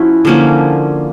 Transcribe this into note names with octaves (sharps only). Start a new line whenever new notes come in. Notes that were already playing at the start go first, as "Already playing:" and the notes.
Already playing: F3 C#4 E4 F#4
D3 F3 A#3 C#4